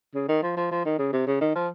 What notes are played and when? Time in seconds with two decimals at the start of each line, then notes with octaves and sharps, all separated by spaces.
0.15 C#3
0.29 D#3
0.43 F3
0.57 F3
0.71 F3
0.85 D#3
0.99 C#3
1.13 C3
1.27 C#3
1.41 D#3
1.55 F3